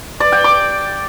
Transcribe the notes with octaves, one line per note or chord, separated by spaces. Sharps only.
D5
G5
D6